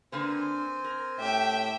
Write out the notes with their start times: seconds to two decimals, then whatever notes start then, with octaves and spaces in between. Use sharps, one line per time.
0.12 D3 A#3 C4 B4 C5 G#5
0.84 A#4
1.20 A2 G4 E5 G5